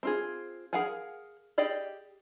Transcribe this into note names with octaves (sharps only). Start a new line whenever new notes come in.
C4 F4 G#4
G#4 A#4 F5 F#5 G#5
G4 G#4 D5 D#5